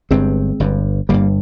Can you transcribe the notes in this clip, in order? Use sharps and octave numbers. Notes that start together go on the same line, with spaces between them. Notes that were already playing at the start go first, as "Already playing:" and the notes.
G1 G2 G#3 C4
G1 G2
G1 G2 G3 A#3